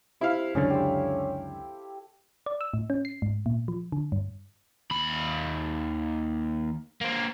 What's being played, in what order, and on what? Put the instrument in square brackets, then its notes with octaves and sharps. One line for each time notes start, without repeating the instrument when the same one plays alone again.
[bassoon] C3 [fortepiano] E4 F5
[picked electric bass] C#2 F#2 D3 [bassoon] C#4 [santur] G#4 A4
[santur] C4 G4
[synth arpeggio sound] D5
E6
A2
C#4
C7
G#2
A#2
F3
D3
G2
[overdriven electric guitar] D#2 B5
A#3 C4